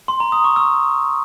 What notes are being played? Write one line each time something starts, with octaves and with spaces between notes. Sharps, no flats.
C6
A#5
D#6
C#6
E6